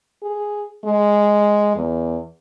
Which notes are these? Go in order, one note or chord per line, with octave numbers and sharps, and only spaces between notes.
G#4
G#3
E2